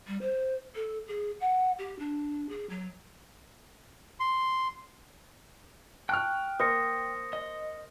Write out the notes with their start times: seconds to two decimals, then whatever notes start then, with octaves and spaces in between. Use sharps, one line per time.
0.07 G3
0.21 C5
0.75 A4
1.08 G#4
1.40 F#5
1.78 G4
1.99 D4
2.49 G#4
2.70 F#3
4.20 C6
6.09 G5 A5 C#6 F6 F#6
6.59 A#3 C5 D#6 A#6 C#7
7.33 D#5